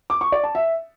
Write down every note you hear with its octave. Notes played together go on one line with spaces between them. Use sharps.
D6
C#6
D5
A5
E5